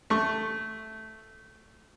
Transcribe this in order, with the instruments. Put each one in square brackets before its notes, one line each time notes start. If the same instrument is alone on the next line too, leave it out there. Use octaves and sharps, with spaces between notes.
[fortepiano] A3 C#6